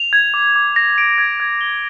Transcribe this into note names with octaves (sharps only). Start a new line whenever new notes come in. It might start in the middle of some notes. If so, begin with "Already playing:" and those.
Already playing: F7
G#6
D6
D6
A#6
D7
G#6
G#6
G7